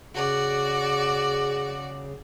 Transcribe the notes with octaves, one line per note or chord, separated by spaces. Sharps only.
C#3 F#4 G#4 D5